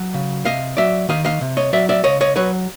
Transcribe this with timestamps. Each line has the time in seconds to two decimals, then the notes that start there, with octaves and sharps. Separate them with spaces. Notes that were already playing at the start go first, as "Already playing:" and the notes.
Already playing: F#3
0.14 C#3
0.45 C3 D#5 F5
0.77 F#3 D5 E5
1.09 D#3 D#5 F5
1.25 D#5 F5
1.41 C3
1.57 C#5 D#5
1.73 F#3 D5 E5
1.89 D5 E5
2.04 C#3 C#5 D#5
2.21 C#5 D#5
2.36 F#3 B4 C#5